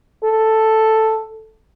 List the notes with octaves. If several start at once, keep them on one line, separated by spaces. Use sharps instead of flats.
A4